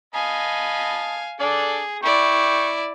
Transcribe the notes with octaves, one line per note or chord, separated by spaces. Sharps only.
D#5 F5 G#5 A5 B5
D4 G#4 A4 D5
E4 D5 G5 C#6